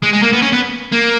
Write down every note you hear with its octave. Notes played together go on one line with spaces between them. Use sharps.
G#3
G#3
A#3
B3
C#4
B3
A#3